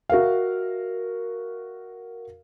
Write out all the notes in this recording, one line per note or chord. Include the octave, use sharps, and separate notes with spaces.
F#4 A#4 E5 F5